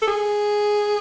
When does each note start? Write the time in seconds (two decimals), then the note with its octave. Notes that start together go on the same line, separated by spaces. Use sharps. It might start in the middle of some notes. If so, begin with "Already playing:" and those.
0.02 A4
0.07 G#4